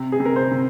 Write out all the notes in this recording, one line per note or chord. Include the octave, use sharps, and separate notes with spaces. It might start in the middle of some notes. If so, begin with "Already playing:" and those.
Already playing: C3
G#4
C3
A#4
C5
C3